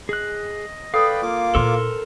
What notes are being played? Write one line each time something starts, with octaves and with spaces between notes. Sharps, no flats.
G#4 D#5 F#6
A4 B4 D5 F5 G5 D#6
A#3 F4 D6
A#2 E4 A4 A#4 C5 C6